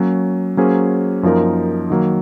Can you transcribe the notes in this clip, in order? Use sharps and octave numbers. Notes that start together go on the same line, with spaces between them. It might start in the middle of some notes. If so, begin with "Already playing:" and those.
Already playing: F#3 A#3 C#4
F#3 A#3 C#4 G#4 C5
F#2 F3 A#3 D#4 A#4
D#3 F#3 A#3